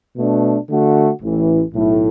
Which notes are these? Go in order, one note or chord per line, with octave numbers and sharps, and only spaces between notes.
B2 A3 D4
D3 A3 F#4
A1 A2 E3
B1 A2 A3 E4